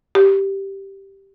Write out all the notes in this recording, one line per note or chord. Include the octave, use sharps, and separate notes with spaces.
G4